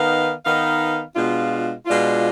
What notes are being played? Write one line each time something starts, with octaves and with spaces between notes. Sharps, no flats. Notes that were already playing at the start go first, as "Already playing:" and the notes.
Already playing: D#3 B3 D#4 B4 F5
D#3 B3 D#4 B4 F5
B2 G#3 D4 F4
B2 G#3 D4 F4